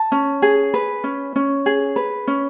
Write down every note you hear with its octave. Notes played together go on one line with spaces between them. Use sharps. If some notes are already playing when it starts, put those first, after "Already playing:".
Already playing: A5
C#4
G#4
B4
C#4
C#4
G#4
B4
C#4